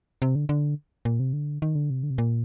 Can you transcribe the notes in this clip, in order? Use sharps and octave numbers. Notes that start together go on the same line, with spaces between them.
C3
D3
D3
A#2
C3
D3
D#3
D3
C3
D3
C3
A#2